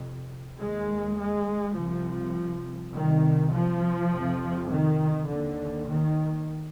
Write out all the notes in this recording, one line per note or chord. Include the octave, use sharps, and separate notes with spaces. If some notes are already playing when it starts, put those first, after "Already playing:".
Already playing: F2 C3
D#2 G#3
G#3
C2 C3 F3
C2 C3 D#3
F3
F2 C3
D#3
D#2 D3
D#3